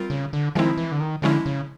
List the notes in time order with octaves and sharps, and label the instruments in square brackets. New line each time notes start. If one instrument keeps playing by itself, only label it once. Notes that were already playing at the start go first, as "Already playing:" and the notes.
Already playing: [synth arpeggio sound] G3 C4 F4 A#4
[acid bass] C#3
D3
[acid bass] D#3 [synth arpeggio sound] F3 G#3 C4 E4
[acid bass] E3
D3
D#3
[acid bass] D3 [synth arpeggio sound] F3 G#3 C#4 E4
[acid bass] C#3